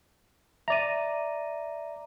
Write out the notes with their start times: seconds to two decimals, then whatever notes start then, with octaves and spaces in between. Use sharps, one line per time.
0.68 D5 E5 A#5 D#7